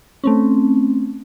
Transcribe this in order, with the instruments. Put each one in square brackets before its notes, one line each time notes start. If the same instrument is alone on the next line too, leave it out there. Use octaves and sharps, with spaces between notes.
[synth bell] A3 C4 C#4